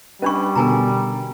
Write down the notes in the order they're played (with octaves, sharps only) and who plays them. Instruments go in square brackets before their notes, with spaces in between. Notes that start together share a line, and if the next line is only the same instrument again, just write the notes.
[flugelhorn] G3 [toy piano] C#4 D4 C#6 [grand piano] B4 B5
[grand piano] B2 D3 B3 [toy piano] A#4 G#5 A#5